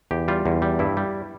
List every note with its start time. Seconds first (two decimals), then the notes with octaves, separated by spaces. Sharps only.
0.11 E2 G4
0.28 G3 F4
0.46 E2
0.62 G3
0.79 G2 E4
0.97 G3